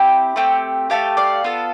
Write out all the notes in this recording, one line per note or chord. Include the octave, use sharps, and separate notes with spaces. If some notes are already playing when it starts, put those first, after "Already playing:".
Already playing: C4 E4 G4
A3 C4 G4
A3 C4 G4 F5 A5
D5 F5
B3 F4 A4